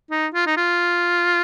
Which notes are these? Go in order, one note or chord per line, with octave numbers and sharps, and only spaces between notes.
D#4
F4
D#4
F4